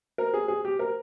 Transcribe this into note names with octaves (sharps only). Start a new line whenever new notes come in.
A#4
G#4
G#4
G4
A#4